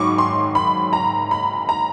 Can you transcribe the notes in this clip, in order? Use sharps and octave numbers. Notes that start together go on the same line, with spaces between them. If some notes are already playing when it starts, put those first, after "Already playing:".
Already playing: G#2 D#3 F#3 B5 C#6 D6
C6
B5
A#5
B5
A#5